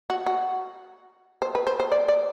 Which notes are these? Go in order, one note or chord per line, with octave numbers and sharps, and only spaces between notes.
F#4
F#4
C5
B4
C5
C5
D5
D5